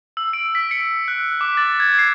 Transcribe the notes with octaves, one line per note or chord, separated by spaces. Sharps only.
E6
D7
B6
C#7
F#6
D6
A6
G#6
C7